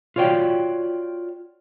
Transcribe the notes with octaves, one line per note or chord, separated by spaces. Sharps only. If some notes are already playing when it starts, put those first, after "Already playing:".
F4 F#4 C#5 D5 G5